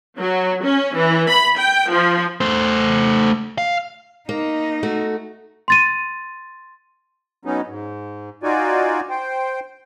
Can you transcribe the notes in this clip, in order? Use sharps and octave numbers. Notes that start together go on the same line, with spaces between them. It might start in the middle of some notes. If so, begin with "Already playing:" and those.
F#3
C#4
E3
B5
G5
F3
A3 C5
F5
A#3 D#4
A3 F#4
C6 A6 D#7
F#3 B3 C#4 D#4
G#2
D#4 F4 F#4 D5 G#5
C5 G5